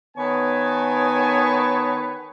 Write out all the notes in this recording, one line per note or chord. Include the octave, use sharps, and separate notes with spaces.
D#3 B3 B4 C#5 G#5 A5